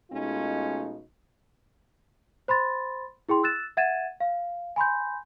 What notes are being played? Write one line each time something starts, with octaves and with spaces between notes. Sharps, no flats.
B2 G#3 A3 C#4 D#4 F4
C5 B5 C6 A6
E4 G#4 G5 C6
E6 F#6 A6 E7
E5 F#5 G#6 A6 D#7 E7
F5
G#5 B5 C6 G6